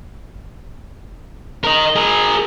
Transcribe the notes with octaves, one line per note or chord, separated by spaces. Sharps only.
A#4 D#5
G#4 A#4